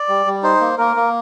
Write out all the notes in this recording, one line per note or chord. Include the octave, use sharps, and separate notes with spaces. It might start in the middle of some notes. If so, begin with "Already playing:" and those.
Already playing: D5
G3
G3
D#4 C5
A#3
A#3 A#4
A#3